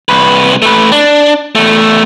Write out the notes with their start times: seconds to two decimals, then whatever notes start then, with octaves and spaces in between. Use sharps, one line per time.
0.09 C2 B4
0.62 A3 B4
0.92 D4
1.55 E2 A3